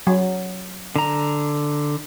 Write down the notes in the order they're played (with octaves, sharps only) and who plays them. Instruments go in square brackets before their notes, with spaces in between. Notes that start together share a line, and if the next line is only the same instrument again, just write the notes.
[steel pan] F#3
[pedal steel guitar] D3 A#5